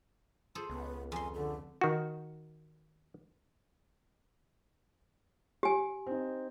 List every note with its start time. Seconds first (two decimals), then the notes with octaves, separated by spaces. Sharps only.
0.55 F4 G#4 A4 C5
0.70 C#2 B3
1.12 F2 G#5 C6
1.34 D3 A4
1.81 D#3 F#4
5.63 G4 G#5
6.06 C4 D#4